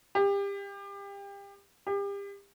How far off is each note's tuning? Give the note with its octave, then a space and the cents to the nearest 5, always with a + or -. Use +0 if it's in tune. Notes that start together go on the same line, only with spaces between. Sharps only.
G4 +30
G4 +35